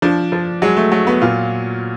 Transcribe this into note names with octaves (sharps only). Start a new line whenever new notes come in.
F3 D4
F3
F#3 G#3
A3
F#3 A3
B3
A#2 F4